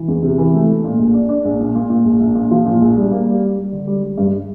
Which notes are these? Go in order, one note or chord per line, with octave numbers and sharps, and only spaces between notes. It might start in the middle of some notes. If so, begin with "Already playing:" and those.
Already playing: E3
E2
C3
E3
A3
A3
A#2
A#1
D4
D4
A#1
A#2
A#2
A#2
A#1
A#1
A#2
F3
A#2
A#1
G3
A#3
G3
G3
G3
D3
G3
G3
G2